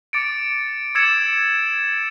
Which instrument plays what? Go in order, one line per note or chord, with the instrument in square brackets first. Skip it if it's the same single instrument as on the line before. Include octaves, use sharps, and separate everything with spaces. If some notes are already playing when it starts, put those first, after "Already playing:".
[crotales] D6 A6 C#7 D7
D6 E6 G#6 A6 C#7 E7